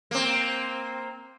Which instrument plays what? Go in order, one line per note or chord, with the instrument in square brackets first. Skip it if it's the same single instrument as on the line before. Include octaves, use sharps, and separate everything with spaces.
[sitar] A#3 C4